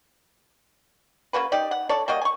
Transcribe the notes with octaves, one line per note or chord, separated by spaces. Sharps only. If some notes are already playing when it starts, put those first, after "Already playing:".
C#3 A#3 F#4 B4
D#4 G4 D5
F#5
A4 C#5 D5
G3 A#3 F#4 D#5
G#5 C#6